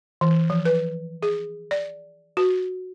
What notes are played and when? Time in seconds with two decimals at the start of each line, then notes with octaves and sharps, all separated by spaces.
0.21 E3
0.50 F3
0.65 B4
1.23 G#4
1.71 D5
2.37 F#4